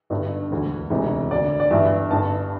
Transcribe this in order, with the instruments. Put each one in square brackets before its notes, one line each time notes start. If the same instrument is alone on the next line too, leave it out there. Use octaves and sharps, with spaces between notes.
[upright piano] G1 G2 D3
E1 D2 D3
E1 D2 C3 E3
D2 D3 D5
D5
G1 G2 E3 E5
G1 G2 D3 A5